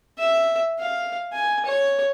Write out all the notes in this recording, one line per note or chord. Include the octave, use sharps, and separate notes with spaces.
E5
F5
G#5
C#5